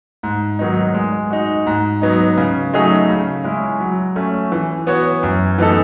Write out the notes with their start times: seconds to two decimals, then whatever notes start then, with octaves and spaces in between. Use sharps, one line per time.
0.23 G#2
0.59 D#3 F#3 B3 D#4
0.94 G#3
1.30 D#4 F#4
1.67 G#2
2.02 F#3 B3 D#4
2.38 C#3
2.73 F#3 A3 D#4 G#4
3.09 C#3
3.44 G#3 C#4 E4
3.81 F#3
4.16 A3 C#4
4.52 E3
4.87 B3 F#4 C#5
5.23 F#2
5.58 E3 B3 D#4 A4